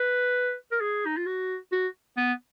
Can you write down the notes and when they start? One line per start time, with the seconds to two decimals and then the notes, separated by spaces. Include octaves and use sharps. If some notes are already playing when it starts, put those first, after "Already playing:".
Already playing: B4
0.72 A#4
0.81 G#4
1.06 D#4
1.17 F4
1.26 F#4
1.72 F#4
2.17 B3